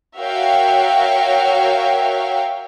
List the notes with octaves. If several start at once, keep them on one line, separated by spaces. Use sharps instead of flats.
F#4 A#4 C#5 E5 F5 G5